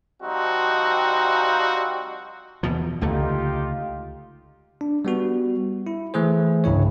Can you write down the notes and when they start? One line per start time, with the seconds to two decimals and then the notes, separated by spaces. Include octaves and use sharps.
0.23 F3 G3 C4 D#4 F#4
2.63 E2 B2 F3
3.01 C#2 D3 A3 D#4 F4 G4
4.81 D4
5.05 G3 B3 F#4
5.87 E4
6.14 E3 A3 G#4 C5
6.64 C2 G2 C#3 E4 C#5